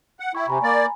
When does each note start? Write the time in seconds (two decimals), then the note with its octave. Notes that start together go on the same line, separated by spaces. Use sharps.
0.20 F#5
0.35 E4 G5 C#6
0.48 C3 G#5 A#5 B5
0.63 A#3 D5